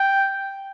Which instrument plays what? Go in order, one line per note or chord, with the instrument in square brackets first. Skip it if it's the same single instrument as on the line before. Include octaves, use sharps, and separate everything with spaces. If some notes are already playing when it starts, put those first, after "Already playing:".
Already playing: [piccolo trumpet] G5